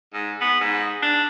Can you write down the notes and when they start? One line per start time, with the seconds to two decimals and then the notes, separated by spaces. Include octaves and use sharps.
0.14 G#2
0.41 B3
0.61 G#2
1.02 D4